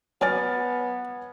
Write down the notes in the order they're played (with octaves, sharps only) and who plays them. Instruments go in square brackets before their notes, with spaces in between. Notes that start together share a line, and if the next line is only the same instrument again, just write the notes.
[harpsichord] F#3 C#4 D5 [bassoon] B3 [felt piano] G#5 F6 A6